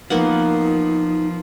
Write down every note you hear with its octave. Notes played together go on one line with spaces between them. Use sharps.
F3 A#3 B3 D#4 F#5